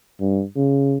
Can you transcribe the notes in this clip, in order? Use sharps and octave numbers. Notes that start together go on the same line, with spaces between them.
G2
C#3